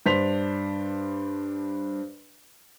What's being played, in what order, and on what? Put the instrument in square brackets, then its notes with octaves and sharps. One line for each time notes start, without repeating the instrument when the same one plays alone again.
[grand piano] G2 D4 C5 B6 F7